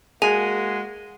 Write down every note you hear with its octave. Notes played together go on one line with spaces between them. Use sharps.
G#3 A#3 F#4 G#4 G#5